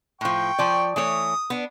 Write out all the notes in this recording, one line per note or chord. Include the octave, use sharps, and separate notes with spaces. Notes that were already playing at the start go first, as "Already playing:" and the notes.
A2 F3 G5 C#6
F3 D5
E3 A3 C#5 D#6
B3 D4